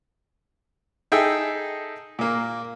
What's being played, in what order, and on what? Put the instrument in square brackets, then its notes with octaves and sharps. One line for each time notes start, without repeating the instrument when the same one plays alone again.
[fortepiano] D#4 G#4 A4 E5 G5
A#2 A#3